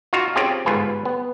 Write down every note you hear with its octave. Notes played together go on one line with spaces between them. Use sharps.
D#4 F4 F#4 F5
C4 C#4 F4 G4 G#4
G1 G#2 F4 B4 G#5
B3